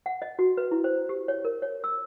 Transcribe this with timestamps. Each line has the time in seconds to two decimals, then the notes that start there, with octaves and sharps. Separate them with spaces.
0.06 F#5
0.22 D#5
0.39 F#4
0.57 B4
0.72 E4
0.84 C5
1.09 G4
1.28 C#5
1.45 A#4
1.62 C#5
1.84 E6